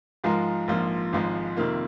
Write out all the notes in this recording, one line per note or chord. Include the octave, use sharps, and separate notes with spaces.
G#2 F3 G#3 F4 A#4
A#1 G#2 F3 A#3 F4
G#1 G#2 F3 G#3
F2 C3 D#3 A#3 F4